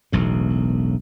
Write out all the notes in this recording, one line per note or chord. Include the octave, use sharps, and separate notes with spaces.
E1 B1 A2